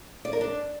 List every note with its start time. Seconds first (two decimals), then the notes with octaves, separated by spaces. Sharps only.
0.25 D5
0.33 A#4
0.41 D4